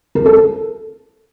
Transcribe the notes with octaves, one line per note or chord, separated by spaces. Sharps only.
A#4
A4